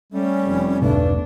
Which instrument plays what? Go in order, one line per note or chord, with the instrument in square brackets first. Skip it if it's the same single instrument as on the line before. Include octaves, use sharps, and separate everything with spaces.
[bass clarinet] G3 [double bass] A3 [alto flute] C#4
[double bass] F1
[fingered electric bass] E1 B1 B2 [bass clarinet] G2 [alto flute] A3 [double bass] D4